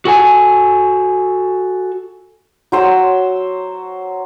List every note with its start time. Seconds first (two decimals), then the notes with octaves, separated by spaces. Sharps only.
0.05 F#4 A4 G#5
2.72 F#3 C5 E6